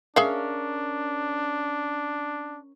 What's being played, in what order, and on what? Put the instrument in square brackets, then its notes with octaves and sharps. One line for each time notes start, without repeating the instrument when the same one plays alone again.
[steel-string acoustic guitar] C#4 A#4 [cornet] D4 [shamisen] G#4 E5 F5